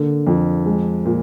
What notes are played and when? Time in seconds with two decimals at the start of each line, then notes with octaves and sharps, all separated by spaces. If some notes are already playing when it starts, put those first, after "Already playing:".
Already playing: D3 A#3
0.27 F2
0.66 G#3
1.05 A#2